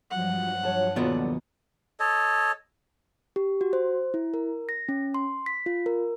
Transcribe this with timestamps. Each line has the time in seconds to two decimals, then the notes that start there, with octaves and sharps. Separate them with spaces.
0.10 G2 F3 F#3 F#5
0.63 C#5 A5
0.96 D#2 B2 B3 F4 A4 D5
2.00 A4 C#5 D#5
3.36 G4
3.61 F#4
3.73 C5
4.14 E4
4.34 A#4
4.69 A#6
4.89 C#4
5.14 C6
5.46 B6
5.66 F4
5.86 A#4